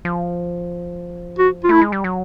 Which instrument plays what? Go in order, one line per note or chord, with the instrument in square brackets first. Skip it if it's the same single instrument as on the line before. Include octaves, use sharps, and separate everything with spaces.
[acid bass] F3
[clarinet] F#4
F4
[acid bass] A3 [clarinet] E4
[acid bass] G#3
G3
F#3